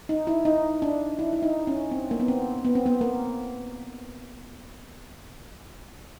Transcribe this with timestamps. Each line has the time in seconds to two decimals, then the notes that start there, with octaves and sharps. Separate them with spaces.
0.09 D#4
0.27 E4
0.45 D#4
0.82 D4
1.19 E4
1.33 E4
1.43 D#4
1.67 C#4
1.92 C4
2.11 A#3
2.20 B3
2.28 C4
2.65 B3
2.75 C4
2.86 B3
3.01 A#3